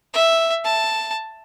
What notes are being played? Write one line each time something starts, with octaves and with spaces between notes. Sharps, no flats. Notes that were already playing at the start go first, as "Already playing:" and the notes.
E5
A5